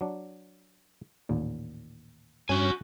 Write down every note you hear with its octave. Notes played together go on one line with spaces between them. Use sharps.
F#3 D4
A1 D#2 A#2
G2 C#4 F#4 G#5